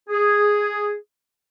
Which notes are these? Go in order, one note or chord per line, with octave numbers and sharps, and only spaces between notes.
G#4